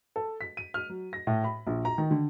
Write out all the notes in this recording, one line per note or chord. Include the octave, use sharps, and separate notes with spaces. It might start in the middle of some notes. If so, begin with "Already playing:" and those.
A4
B6
D#7
F6
F#3
A#6
A2
B5
A#1
A#5
D#3
D3